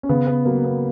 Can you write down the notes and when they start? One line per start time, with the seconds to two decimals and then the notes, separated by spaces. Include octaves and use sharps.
0.03 C#4
0.09 C#3 B3
0.27 B3
0.45 F#3 A#3
0.64 B3